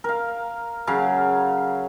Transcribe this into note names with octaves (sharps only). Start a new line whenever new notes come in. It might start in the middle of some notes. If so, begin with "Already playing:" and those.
A#4 F5
C#3 F#3 F5